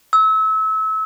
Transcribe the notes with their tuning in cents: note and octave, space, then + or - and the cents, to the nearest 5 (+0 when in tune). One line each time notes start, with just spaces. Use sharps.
E6 -30